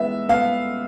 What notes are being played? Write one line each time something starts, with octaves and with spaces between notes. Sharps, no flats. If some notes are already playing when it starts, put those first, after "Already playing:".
Already playing: E3 G#3 B3 E5
B3 F5